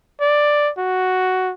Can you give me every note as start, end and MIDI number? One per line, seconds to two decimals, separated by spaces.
0.20 0.70 74
0.78 1.53 66